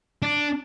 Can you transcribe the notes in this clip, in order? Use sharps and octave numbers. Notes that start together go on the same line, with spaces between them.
D4